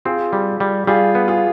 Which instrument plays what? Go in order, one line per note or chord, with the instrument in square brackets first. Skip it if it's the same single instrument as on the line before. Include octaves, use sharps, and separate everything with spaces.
[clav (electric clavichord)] C4 [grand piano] F4 G#4
[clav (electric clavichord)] G3
G3
[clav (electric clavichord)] G3 [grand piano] F4 G#4
[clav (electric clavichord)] B3
[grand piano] F4 G#4